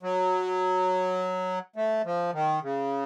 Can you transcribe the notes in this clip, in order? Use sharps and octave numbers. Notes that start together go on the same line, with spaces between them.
F#3
A3
F3
D#3
C#3